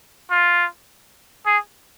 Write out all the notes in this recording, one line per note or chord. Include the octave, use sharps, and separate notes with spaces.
F4
G#4